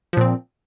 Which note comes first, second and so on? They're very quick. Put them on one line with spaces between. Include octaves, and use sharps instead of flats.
F3 A#2 C4